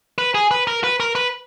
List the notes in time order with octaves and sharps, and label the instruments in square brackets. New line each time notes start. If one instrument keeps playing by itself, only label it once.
[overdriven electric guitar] B4
G#4
B4
A#4
B4
A#4
B4